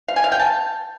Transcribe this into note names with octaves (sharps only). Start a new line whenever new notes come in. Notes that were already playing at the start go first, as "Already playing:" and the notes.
F5
G#5
F5
G5
A5